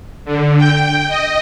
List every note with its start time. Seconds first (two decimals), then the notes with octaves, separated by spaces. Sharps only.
0.25 D3
0.57 G5
1.08 D#5